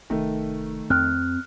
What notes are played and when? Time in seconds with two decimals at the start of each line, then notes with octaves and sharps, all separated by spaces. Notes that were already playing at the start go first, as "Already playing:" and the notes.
0.10 F1 D#3 A3
0.90 F2 C4 F6 F#6